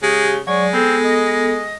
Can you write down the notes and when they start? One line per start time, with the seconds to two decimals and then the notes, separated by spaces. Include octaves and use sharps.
0.03 C#3 G#3 G4
0.47 F#3 G#3 C#5 D5
0.73 B3 C4 A4
1.04 D#5